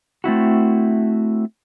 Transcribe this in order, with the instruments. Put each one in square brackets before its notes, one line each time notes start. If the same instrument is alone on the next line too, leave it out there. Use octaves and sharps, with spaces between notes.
[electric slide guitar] A3 C4 E4 F#4